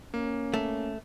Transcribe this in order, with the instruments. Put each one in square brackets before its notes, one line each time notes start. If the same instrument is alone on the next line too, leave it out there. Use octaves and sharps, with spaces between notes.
[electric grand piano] A#3 [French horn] C#4
[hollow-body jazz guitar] A3